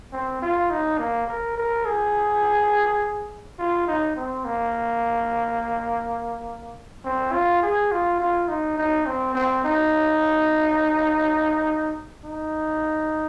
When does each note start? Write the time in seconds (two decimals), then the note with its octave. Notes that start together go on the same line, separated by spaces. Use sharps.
0.13 C4
0.42 F4
0.70 D#4
0.99 A#3
1.28 A#4
1.57 A#4
1.85 G#4
3.59 F4
3.88 D#4
4.16 C4
4.45 A#3
7.05 C4
7.33 F4
7.62 G#4
7.91 F4
8.19 F4
8.48 D#4
8.77 D#4
9.06 C4
9.35 C4
9.64 D#4
12.24 D#4